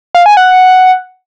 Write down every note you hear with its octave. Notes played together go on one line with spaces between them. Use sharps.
F5
G#5
F#5